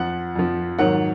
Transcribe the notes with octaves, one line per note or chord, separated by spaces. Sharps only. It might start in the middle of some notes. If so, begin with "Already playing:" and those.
Already playing: F2 F3 F#5
F2 F3
G#2 D#3 F#3 F#5